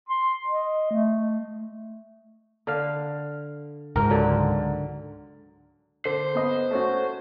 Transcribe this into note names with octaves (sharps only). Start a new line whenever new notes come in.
C6
D#5
A3
D3 F5
C#2 G#2 A#4
D3 F#3
D3 C5
B3 D#5
A3 C#4 F#4